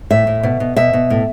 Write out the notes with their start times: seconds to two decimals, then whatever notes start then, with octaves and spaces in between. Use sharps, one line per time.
0.11 A2 E5
0.27 A2
0.43 B2
0.60 B2
0.76 B2 E5
0.93 B2
1.10 A2